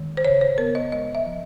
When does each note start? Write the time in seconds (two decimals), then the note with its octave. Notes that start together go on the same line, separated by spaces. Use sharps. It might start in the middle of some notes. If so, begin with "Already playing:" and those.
Already playing: D#3 G#3
0.17 C5
0.25 C#3 C#5
0.41 C5
0.58 B3 A#4
0.75 D#5
0.92 G#3 D#5
1.15 E5
1.26 F3